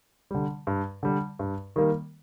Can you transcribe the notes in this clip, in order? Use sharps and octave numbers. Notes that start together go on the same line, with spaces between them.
D3 G3
G2
D3 G3
G2
D#3 G3 A#3